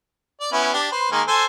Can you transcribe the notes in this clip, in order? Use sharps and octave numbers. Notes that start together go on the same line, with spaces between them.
D5
B3 C#4 E4
D4 G4
B4 C5
D#3 G#3 A#3
A4 C5 G#5